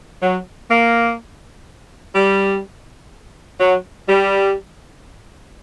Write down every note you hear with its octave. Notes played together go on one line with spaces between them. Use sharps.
F#3
A#3
G3
F#3
G3